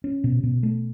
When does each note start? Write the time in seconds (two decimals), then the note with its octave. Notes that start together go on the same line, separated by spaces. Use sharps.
0.04 C#4
0.24 B2
0.43 B2
0.63 A3